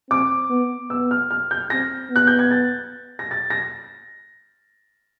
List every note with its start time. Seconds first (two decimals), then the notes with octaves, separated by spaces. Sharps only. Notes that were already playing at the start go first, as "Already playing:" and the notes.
0.10 C4 D6
0.50 B3
0.90 B3 E6
1.11 F6
1.31 F6
1.51 G6
1.70 C4 A#6
2.11 B3 F#6
2.27 G6
2.39 G#6
2.51 A6
3.19 A#6
3.31 A6
3.50 A#6